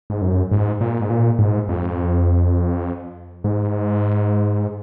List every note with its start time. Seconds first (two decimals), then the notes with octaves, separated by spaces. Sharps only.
0.10 G#2
0.22 F#2
0.51 G#2
0.81 A#2
1.01 G#2
1.10 A#2
1.39 G#2
1.69 F2
3.44 G#2